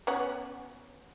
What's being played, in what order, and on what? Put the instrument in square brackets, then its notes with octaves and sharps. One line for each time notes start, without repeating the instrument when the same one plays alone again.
[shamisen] B3 C#4 F#4